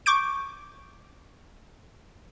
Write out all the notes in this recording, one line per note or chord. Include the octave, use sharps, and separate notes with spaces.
C#6 D6 G6 D7